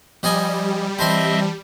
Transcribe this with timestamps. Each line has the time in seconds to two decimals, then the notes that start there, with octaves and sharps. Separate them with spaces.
0.23 F3 G3 D#5 G#5
0.99 E3 C4 C5 D#5 E5 A5 B5 C6